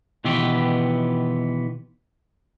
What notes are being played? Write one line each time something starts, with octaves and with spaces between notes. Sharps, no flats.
B2 D#3 E3 B3 F4 G4